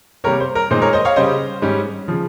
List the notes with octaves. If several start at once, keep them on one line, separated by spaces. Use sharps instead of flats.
C3 G3 A#3 A#4 C#5
C5
A#4
A#2 G#3 D#4 C5
A#4 C#5
C5 D#5
C#5 F5
C#3 G3 C#4 C5 D#5
G#2 G3 C#4
C#3 F3